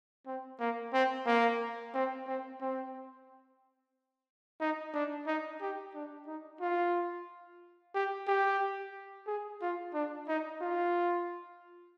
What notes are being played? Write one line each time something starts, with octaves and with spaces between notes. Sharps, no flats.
C4
A#3
C4
A#3
C4
C4
C4
D#4
D4
D#4
G4
D4
D#4
F4
G4
G4
G#4
F4
D4
D#4
F4